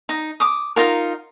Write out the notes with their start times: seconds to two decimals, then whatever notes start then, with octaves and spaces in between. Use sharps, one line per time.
0.09 D#4
0.40 D6 D#6
0.76 D#4 F4 A#4